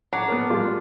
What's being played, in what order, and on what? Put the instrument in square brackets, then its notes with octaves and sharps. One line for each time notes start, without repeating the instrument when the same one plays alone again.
[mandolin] D4 [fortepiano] C#5 F#5 A#5
[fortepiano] B3 A#4
G3 G#3 F4